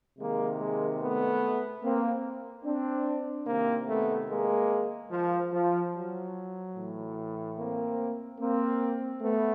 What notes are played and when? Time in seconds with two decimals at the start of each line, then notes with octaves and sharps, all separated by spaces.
0.19 C3 D#3 G#3 A#3
0.60 G#3 A#3
1.01 A3 B3
1.83 A#3 C4
2.65 C4 D4
3.47 C3 D#3 A#3 C4
3.88 A3 B3
4.29 G#3 A#3
5.11 F3
5.52 F3
5.94 F#3
6.75 A2 E3
7.57 A#3 C4
8.39 A#3 C4
9.21 A3 B3